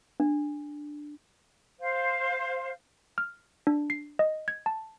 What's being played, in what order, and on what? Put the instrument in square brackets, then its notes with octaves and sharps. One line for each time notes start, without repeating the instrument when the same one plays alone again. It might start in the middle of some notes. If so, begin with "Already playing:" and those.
[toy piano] D4
[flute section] C5 F5
[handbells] F6
D4
C7
D#5
G#6
A5